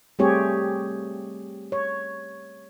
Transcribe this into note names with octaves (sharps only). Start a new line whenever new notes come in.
G3 A3 C4 G4 G#4 C#5
C#5